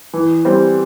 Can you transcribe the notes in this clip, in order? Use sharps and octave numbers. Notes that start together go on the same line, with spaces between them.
E3
G3 C4